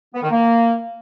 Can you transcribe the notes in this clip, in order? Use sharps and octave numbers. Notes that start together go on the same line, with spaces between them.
B3
D#3
A#3